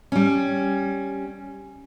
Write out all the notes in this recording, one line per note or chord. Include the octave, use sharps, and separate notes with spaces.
G3 C#4